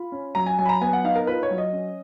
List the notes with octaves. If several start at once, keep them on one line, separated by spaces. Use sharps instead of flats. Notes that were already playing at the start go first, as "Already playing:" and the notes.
Already playing: F4 B5
C#4
F#3 A#5
G#5
F#3 G#5
B5
A#5
B3 G#5
F#5
D#4 F5
A#4
F4 B4
C#5
F#3
D#5
C#4